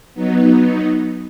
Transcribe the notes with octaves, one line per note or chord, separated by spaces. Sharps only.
F#3 B3 D#4